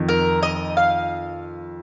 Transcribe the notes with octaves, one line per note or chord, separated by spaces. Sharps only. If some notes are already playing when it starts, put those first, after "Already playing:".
Already playing: F2 D#3
A#4
D#5
F5